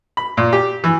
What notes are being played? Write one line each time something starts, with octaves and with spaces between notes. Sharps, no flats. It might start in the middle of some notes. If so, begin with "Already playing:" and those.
B5
A#2
G4
E3